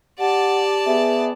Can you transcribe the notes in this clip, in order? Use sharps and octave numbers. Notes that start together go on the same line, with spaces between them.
G4 D5 F#5 A5
B3 G#4 E5